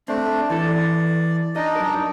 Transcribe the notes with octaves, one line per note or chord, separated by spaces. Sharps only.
A3 C4 D4
E3 A4 D5
D4 D#4 D#5
F#2 A#4